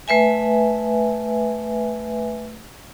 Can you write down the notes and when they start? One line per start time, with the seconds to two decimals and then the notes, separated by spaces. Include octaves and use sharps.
0.08 A3 B4 E5 G#5